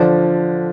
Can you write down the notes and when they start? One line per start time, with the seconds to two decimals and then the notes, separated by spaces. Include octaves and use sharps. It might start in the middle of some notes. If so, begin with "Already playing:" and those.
Already playing: D3 F3 D4 C5